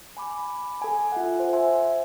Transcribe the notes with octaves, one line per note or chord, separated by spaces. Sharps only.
G#5 B5 D6
A4 G#5
F4 E5 F#5
C5
E5 G#5 C6